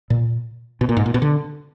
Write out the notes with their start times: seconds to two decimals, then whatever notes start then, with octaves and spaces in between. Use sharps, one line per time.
0.10 A#2
0.81 B2
0.89 A#2
0.97 G#2
1.06 A#2
1.14 B2
1.22 D3